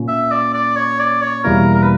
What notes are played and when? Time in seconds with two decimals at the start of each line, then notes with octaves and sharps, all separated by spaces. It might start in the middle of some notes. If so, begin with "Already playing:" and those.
Already playing: A#2 A#3 C#4
0.08 E5
0.31 D5
0.54 D5
0.76 C#5
0.99 D5
1.21 C#5
1.44 E2 B2 G3 A#3 E4 A#4
1.74 A#4
1.82 B4